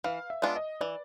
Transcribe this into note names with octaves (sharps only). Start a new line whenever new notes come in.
E3 F5
E5
G#3 B3 D4 F4
D#5
E3 D5